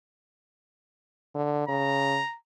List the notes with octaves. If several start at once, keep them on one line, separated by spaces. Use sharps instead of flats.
D3
C#3 A#5